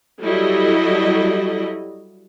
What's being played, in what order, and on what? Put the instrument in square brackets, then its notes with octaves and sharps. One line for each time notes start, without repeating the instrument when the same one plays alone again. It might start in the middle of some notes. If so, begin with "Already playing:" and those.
[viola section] F#3 G3 E4 A4 D#5